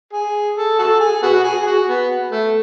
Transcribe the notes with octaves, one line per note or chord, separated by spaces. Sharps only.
G#4
A4
F#4 A4
G#4
B3 F#4
G#4
F#4
B3
A3